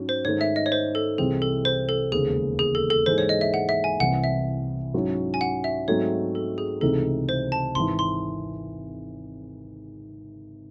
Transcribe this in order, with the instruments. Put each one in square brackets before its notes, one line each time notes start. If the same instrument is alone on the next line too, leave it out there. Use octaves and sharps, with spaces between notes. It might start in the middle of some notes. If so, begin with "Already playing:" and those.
Already playing: [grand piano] G#2 F#3 C#4
[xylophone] C5
[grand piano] G#2 D#3 A3 [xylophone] C#5
[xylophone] E5
D#5
C#5
C5
A4
[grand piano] C2 C3 E3 C4 [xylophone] G#4
[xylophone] A4
C5
A4
[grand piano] E1 D#2 C#3 [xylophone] G#4
[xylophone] G#4
A4
A4
[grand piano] G#2 E3 G#3 [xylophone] C5
[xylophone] C#5
D#5
E5
F#5
E5
G#5
[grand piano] C2 C3 E3 C4 E4 [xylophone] F#5
[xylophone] E5
[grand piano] G#2 F#3 C#4 E4
[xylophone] G#5
F#5
E5
[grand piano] G#2 F#3 A3 C4 D#4 [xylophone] C#5
[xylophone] A4
G#4
[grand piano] C#2 C3 E3 A3 D#4 [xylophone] A4
[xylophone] C5
A5
[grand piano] G#1 G#2 E3 [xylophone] C6
[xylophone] C6